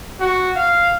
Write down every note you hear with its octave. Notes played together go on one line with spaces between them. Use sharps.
F#4
F5